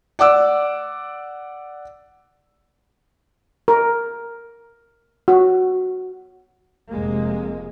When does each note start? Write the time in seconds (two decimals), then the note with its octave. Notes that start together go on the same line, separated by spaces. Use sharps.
0.19 D5 F#5 D6 E6
3.68 A#4
5.28 F#4
6.90 F1 F2 C3 G#3 A#3